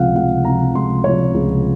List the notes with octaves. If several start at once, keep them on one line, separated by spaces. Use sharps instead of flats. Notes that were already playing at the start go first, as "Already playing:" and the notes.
Already playing: C#2 C3 F3 F5 F#5
C#2 F#5
C3 F3 A#5
C#2 C6
C3 F3 C#5
C#2